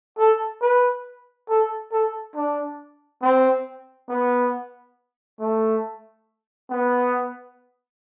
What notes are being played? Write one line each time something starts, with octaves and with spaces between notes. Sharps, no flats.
A4
B4
A4
A4
D4
C4
B3
A3
B3